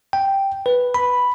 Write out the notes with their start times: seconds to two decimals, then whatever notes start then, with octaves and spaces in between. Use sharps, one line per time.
0.13 G5
0.66 B4
0.94 B5